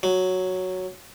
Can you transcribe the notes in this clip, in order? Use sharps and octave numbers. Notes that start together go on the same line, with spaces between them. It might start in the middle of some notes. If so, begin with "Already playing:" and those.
F#3